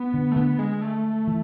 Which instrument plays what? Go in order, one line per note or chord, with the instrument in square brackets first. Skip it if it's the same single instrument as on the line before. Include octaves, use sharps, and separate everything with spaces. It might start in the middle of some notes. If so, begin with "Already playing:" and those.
Already playing: [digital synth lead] B3
[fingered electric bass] D3
[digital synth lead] A3
[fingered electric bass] D3 [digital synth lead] B3
[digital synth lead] G#3
A3
[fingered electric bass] E3